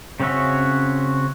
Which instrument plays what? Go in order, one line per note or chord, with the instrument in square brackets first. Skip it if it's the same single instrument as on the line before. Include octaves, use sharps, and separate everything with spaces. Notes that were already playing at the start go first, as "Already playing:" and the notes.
[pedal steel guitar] C#3 C4 C#4 F#4 E5